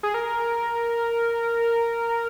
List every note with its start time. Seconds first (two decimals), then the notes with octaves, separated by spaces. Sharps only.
0.03 G#4
0.14 A#4